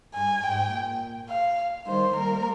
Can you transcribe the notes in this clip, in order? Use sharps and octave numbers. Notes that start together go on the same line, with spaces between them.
G2 G#5
G#2 G5
A#2
F5
D#3 G3 C5
G3 A#3 A#4